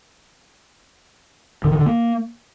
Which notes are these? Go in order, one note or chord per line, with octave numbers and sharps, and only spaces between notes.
D3
D#3
D3
A#3